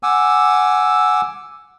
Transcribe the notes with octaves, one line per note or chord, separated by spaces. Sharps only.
F#5 G#5 D6 E6